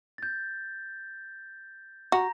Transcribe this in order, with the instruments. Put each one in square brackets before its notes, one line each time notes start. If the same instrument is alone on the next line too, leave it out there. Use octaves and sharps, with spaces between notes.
[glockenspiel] G6 A6
[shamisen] F#4 [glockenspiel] A#5 A#6